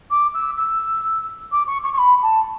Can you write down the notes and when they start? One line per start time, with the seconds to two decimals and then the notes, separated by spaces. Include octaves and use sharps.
0.10 D6
0.34 E6
0.57 E6
1.52 D6
1.67 C#6
1.83 C#6
1.93 C#6
1.98 B5
2.22 A5